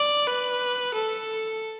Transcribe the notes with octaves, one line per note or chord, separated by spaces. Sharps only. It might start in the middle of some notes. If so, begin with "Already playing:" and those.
Already playing: D5
B4
A4